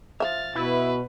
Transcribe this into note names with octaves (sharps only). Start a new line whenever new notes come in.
F3 E5 F6 A6
B2 E4 B4